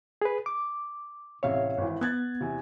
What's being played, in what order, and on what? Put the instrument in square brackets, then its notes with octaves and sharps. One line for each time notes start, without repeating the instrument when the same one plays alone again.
[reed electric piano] G#4 B4
D6
[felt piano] A1 C3 E5 [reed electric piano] C#5 F5
[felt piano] G#1 E3
[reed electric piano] B3 [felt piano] F#6 G#6 A6
[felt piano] E2 C3